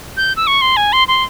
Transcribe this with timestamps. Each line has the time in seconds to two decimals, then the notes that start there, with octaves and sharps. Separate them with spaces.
0.17 G6
0.37 E6
0.47 C#6
0.61 C6
0.77 G#5
0.93 C6
1.08 C6